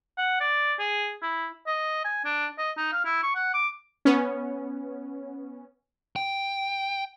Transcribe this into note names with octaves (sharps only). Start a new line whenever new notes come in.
F#5
D5
G#4
E4
D#5
G#5
D4
D#5
D#4
F5
E4
C#6
F#5
D6
B3 C#4
G5